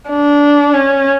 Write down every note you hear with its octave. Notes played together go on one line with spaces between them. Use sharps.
D4
C#4